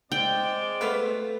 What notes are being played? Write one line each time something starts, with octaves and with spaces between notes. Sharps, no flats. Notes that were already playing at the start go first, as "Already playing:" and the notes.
G#3 C4 D5 G5
A3 B3 F4 B4 F5